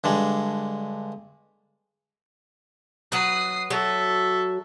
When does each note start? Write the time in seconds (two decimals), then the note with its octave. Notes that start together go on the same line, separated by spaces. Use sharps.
0.04 G2 D3 G#3
3.12 F#3 B4 D#6 C7
3.70 F#3 A4 E5